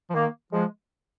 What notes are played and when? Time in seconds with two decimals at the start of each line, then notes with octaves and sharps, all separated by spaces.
0.10 F3
0.15 D#3 A#3
0.53 F3 G#3